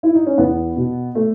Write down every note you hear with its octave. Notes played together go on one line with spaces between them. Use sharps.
E4
D#4
C#4
E2 B3
B2
A3